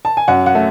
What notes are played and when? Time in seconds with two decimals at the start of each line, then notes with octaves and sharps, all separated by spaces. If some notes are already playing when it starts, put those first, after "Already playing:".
0.05 A5
0.17 G#5
0.28 F#2 F#5
0.46 F#5
0.55 A3